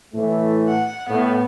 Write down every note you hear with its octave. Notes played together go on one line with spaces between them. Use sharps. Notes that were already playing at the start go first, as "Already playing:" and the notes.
A2 E3 A3
F#5
A2 B3